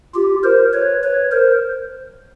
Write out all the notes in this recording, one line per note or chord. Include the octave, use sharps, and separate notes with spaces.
F4 G4
A#4 C5
B4 C#5
B4 C#5
A#4 C5